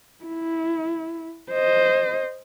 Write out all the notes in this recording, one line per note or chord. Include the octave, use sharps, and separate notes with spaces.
E4
C5 D#5